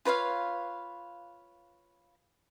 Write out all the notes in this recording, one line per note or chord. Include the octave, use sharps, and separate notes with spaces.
F4 B4 C#5 F5